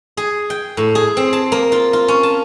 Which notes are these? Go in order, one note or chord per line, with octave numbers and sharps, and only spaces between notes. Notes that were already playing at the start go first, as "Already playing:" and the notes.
G#4
G5
A2
G#4
C4
A5
A#3
F4
F4
C#4
A5